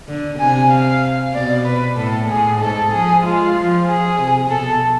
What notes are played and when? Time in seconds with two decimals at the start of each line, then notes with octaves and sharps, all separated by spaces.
0.09 D3
0.40 C3 G#5
0.71 F5
1.34 B2 D5
1.65 B4
1.97 A2 A4
2.28 A2 G#4
2.60 G#2 A4
2.91 F3 G#4
3.24 G#3 F4
3.55 F3
3.87 G#4
4.18 C3
4.50 B2 A4